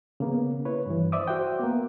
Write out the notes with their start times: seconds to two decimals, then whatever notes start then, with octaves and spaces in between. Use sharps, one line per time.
0.20 C#3 A#3 B3
0.65 E4 B4 C#5
0.86 G2 E3
1.12 C5 D5 E5 D6 D#6
1.28 F#4 C5 E5 F#5 G5
1.60 A#3 B3